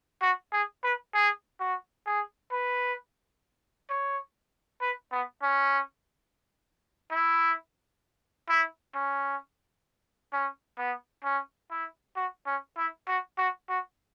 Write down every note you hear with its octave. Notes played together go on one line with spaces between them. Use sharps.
F#4
G#4
B4
G#4
F#4
G#4
B4
C#5
B4
B3
C#4
E4
E4
C#4
C#4
B3
C#4
E4
F#4
C#4
E4
F#4
F#4
F#4